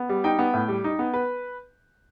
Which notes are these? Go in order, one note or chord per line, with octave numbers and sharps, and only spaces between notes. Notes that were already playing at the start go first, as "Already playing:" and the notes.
Already playing: B3
G3
D#4 G5
B3
A2
G3
D#4
B3
B4